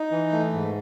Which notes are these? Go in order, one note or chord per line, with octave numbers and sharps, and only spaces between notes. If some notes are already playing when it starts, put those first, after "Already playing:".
Already playing: D#4
E3
A3
G#2